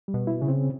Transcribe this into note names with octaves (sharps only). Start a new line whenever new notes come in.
G3
B2
E4
C#3
C4